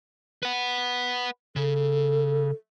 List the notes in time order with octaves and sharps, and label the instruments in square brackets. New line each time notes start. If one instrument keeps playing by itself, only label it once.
[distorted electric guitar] B4 F#5
[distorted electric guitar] C#3 [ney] A4